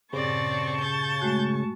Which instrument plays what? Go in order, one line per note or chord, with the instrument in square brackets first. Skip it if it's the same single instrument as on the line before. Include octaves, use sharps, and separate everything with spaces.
[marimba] G2 A#2 [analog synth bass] C#3 [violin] C4 D5 [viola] A5 C#6
[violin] G6 A6
[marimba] G#3 A3 F#4